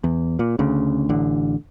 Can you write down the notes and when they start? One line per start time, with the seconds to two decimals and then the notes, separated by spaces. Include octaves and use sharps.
0.04 E2
0.39 A#2
0.59 D2 C#3
1.09 A1 D3